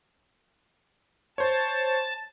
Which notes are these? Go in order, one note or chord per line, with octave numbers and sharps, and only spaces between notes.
C5 C#5 A5